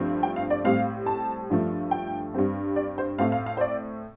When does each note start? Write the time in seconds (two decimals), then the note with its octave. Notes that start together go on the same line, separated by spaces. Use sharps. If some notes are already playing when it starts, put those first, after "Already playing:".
Already playing: G2 F3 A3 C4
0.23 G5
0.36 F5
0.50 D5
0.64 A2 G3 C4 F5
1.06 A5
1.50 G2 F3 A3
1.91 G5
2.34 G2 G3 C4
2.76 D5
2.98 C5
3.18 A2 A3 C4 F5
3.32 F5
3.46 F5
3.57 C5
3.61 D5